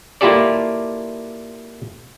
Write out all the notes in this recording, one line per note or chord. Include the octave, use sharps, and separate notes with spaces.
A#3 E4 F4 G4 A4 D5